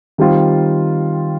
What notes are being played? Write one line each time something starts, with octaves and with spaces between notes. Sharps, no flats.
D#3 G3 C4 F4